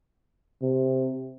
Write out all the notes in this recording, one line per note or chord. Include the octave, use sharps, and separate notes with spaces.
C3